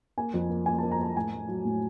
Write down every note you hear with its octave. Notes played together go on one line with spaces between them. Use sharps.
A#3 G#5
F2
A#3
A#3 G#5
A5
A#3
A#5
A#3 A5
A2 G#5
A3
F#3
A2